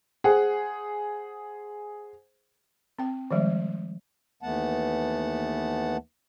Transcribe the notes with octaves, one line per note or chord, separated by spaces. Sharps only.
G#4 C5 F#5
C4 G5
D#3 F3 G3 G#3
D#2 E3 A3 B3 F#5 A5